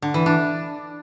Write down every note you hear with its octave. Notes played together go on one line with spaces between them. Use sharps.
D3
E3
D4